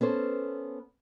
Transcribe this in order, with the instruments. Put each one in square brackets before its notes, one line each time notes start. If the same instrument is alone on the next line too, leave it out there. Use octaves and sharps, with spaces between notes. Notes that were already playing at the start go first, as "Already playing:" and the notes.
[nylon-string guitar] B3 C#4 A4 C5